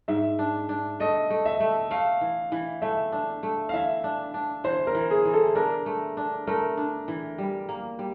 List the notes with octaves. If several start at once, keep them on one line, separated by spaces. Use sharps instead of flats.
G#2 E5
D4
D4
A3 D#5
A3
E5
A3
A3 F5
E3
E3
A3 E5
D4
A3
F5
E3 E5
D4
D4
E3 C5
A#4
E3
G#4
E3
A4
D4 A#4
A3
D4
A3 A#4
D4
E3
G3
A#3
G3